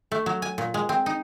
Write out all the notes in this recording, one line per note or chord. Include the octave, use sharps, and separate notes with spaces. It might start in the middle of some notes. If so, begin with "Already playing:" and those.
A3
F#3
G#5
A#2
G#3
C4
D#4